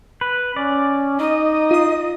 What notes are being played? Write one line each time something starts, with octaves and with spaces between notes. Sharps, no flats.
B4
C#4 D5
D#4 D#5
F4 D#6